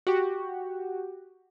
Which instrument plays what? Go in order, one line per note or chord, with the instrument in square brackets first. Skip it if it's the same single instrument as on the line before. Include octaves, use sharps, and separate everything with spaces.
[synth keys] F#4 G4